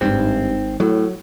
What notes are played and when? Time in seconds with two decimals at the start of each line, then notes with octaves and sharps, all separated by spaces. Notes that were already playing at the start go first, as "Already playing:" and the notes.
0.01 G#1 G2 C4 D#4
0.80 A2 F#3